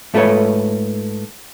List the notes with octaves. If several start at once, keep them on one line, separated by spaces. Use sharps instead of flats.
G#2 A3 F4 A4 B4 C#5